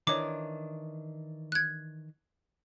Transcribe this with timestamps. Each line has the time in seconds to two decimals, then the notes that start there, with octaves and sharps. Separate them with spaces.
0.07 D#3 E3 D4 C#5 D6
1.52 F#6 G#6